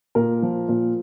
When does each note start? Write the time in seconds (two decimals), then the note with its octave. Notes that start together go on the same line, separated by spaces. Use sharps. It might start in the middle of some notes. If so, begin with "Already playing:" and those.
0.15 A#2 A#4
0.42 F3
0.69 A#2